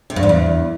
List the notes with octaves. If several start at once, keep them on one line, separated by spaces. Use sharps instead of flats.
C3
G2
F2
E2